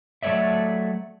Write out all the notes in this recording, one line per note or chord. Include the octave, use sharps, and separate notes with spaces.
F#3 A3 A4 C#5 D5 E5